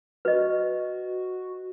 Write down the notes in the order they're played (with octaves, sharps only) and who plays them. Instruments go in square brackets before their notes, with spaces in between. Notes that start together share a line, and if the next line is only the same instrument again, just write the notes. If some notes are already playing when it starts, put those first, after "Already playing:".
[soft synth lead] F#4 [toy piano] B4 D#5